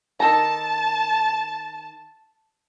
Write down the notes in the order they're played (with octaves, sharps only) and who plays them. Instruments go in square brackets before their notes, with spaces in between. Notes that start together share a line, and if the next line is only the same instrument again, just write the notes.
[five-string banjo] D#3 A4 A#5 [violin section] A5